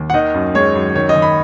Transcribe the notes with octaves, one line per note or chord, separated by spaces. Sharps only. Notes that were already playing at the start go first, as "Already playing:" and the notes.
Already playing: D#2
F#5
D#3 D#5
F#2
G#3 C#5
F#2
D#3 C#5
D#5
D#2
B5